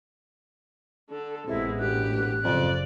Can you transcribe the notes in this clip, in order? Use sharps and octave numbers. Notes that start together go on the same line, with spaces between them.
D3 A4
A1 A2 C3 G#3 B3 E4
E1 G4 F#6
F#1 F2 C#3 D5